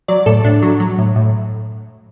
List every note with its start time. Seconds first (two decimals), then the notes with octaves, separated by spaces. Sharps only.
0.08 F#3 D5
0.26 A2 A4
0.44 A2 D4
0.62 F#3
0.80 F#3
0.98 A2
1.16 A2